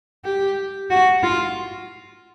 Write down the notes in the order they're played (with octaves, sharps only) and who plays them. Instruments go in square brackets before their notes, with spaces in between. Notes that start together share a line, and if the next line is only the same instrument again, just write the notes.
[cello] G4
F#4
F4